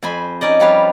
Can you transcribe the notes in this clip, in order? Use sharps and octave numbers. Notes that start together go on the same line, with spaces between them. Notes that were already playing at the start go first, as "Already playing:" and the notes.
F2 C5 G#5 B5 C6
C#4 D#4 D5 D#5
F3 G3 G4 B4 C#5 F5